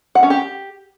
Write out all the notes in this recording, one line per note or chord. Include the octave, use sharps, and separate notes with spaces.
F#5
C#4
G4